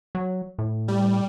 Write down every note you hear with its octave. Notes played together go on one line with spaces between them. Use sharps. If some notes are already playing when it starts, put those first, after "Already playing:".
F#3
A2
G3